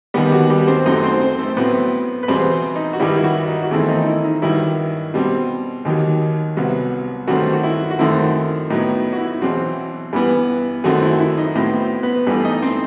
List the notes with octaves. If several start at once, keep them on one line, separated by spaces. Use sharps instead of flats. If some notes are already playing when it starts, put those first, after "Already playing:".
D#2 D#3 G3 B3 G4
F#3 F#4
G3 G4
C4 C5
F#2 F#3 A3 C4 D#4 D#5
C4 C5
C4 C5
A3 A4
A2 F#3 B3 C4 B4
B4
E2 B2 G3 B3 C4 C5
D#4
F#4
G2 D#3 G3 E4
E4
F#3 F#4
D#4
F#4
E2 D#3 A3 C4 E4
D#4
D#4
E4
D#4
G2 D#3 F#3 E4
B2 G3 C4
D#2 D#3 F#3
C2 C3 F#3 B3
G2 D#3 F#3 A3 C4 F#4
F#4
E4
F#4
F#2 D#3 A3 C4 E4
A2 F#3 B3 D#4
F#4
E4
E2 B2 F#3 C4
G2 E3 B3
F#2 D#3 F#3 A3 C4 F#4
E4
E4
D#4 D#5
A2 F#3 B3 C4 C5
B3 B4
G2 E3 A3 B3 B4
D#4 D#5
C4 C5